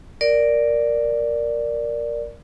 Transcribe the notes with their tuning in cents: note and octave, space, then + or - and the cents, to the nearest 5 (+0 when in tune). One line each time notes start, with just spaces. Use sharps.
A#4 +0 D5 +0